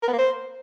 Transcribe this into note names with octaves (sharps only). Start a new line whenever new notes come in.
A#4
B3
A#3
C5